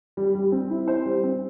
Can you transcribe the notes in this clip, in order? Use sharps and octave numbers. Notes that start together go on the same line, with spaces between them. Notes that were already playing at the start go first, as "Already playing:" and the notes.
G3
G3
C4
E4
C5
G3
C4